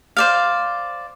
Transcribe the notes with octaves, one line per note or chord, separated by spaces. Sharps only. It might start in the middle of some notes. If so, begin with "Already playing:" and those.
C5 D5 F5